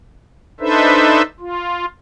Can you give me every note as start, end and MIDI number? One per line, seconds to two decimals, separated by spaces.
0.60 1.22 62
0.60 1.22 63
0.60 1.22 69
0.60 1.22 71
0.60 1.22 72
0.60 1.22 76
1.40 1.86 65